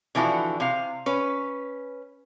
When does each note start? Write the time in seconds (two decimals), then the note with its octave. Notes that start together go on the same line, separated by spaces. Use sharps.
0.15 D3 E3 F3 E4 F#4
0.60 C3 F5
1.06 C#4 B4